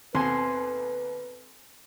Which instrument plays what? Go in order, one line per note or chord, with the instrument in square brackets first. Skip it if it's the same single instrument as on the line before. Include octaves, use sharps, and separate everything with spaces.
[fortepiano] D#2 B2 [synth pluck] C4 A4 [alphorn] B4 [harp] G#5 C6